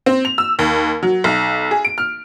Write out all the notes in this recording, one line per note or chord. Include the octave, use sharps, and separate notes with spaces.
C4
F7
E6
D#2
F#3
B1
G#4
D7
F6